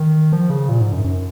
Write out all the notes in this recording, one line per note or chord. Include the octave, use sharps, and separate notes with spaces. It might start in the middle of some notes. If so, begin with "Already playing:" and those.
Already playing: D#3
F3
C#3
A#2
G#2
F#2
F#2